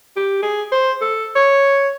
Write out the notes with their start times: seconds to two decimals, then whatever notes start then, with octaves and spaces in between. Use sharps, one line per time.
0.16 G4
0.42 G#4
0.72 C5
1.01 A4
1.35 C#5